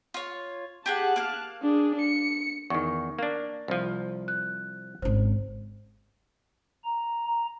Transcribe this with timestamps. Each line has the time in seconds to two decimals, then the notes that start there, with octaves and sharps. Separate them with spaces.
0.14 F4 C#5
0.86 G4 G#4 F#5 A5 F#6
1.16 A#3 F5
1.62 D4 G#4
2.01 C#7
2.70 E2 D#3 C#6
3.19 A#3 D4
3.68 C2 F3
4.28 F#6
5.02 G#1 C#3 C5
6.84 A#5
7.27 A#5